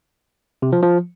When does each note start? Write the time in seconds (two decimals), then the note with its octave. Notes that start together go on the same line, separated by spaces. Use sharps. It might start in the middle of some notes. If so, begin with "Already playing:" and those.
0.62 C3
0.73 F3
0.83 F3